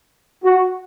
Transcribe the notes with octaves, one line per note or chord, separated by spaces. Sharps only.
F#4